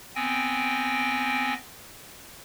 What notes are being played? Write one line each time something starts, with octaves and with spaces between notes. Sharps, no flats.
B3 C4 G5 G#5 A#6